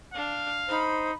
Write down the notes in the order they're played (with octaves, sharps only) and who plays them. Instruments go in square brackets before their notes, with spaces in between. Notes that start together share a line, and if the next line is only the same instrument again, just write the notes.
[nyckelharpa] D4 [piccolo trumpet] F5
[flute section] D#4 C5 [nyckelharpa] B5